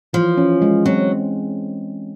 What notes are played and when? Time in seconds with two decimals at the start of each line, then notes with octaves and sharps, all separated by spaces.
0.13 E3 F3
0.37 C#4
0.62 G#3
0.85 F#3 C4